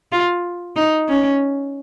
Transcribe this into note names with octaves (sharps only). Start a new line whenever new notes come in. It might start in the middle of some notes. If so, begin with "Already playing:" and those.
F4
D#4
C#4